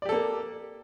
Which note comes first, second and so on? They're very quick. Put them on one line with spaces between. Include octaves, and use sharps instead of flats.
D5 G4 A4 A#3